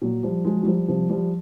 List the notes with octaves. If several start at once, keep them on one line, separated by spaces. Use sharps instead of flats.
A#2 F#3
F3 G3
F3 F#3 G#3
F#3
F3 G3
C3 F3 G3
F3 G3